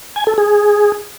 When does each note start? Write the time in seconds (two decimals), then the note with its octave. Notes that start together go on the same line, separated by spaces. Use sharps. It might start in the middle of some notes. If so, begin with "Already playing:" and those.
0.16 G#5
0.27 A4
0.38 G#4